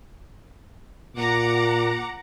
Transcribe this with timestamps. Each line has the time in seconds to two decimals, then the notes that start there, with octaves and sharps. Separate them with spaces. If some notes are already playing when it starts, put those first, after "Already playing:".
1.16 A#2 F#5 A#5 D6